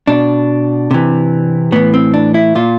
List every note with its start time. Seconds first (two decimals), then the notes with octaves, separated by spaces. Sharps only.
0.07 B2 D4
0.91 C3 E3
1.72 A2 E3 B3
1.94 C4
2.14 D4
2.34 E4
2.55 A#2 F4